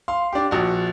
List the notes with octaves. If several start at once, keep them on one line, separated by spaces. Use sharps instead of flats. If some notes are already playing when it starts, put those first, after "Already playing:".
F5 C6
D4 G4
A#1 F#4